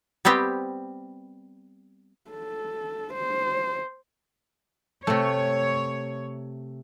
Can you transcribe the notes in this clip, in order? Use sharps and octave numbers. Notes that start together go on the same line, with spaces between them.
G3 B3 C4 G4 G5
A4
C5
C3 A3 C#5